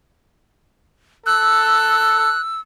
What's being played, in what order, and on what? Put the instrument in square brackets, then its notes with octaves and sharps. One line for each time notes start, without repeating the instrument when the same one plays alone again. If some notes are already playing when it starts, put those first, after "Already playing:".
[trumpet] A4 [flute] E6 [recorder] F#6